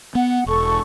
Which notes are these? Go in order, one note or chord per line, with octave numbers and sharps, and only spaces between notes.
B3 F#5
E1 A4 C#6